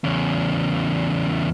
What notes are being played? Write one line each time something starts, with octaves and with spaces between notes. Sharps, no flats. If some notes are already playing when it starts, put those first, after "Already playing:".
E2 C#3